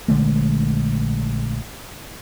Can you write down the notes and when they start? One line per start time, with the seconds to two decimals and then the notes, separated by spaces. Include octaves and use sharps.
0.08 A#1 D3 G#3 A3